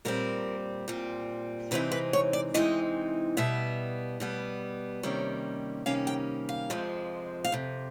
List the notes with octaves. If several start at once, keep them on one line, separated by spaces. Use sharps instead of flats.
A#2 G3 C4 A#4
A#2 G3 C4
C3 E3 G#3 C4 D#4 B4
B4
C#5
D5
C3 E3 G#3 C4 D#4 D#5
B2 G3 B3 E5
B2 G3 B3
C3 D#3 G3 A#3 C#4
C3 D#3 G3 A#3 C#4 F5
G5
F5
F2 C3 F3 G#3 C4
F5
F2 C3